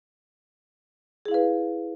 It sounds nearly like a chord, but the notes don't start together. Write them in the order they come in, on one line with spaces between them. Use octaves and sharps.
G#4 E4 F5 B4